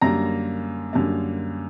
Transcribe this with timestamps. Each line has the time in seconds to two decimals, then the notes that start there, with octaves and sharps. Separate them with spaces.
0.02 F#2 D3 G3 A#3 A#5 A#6
0.93 F#2 D3 G3 A#3